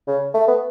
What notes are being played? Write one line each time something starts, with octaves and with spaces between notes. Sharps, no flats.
C#3
A3
B3